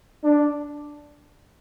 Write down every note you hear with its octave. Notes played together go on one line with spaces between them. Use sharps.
D4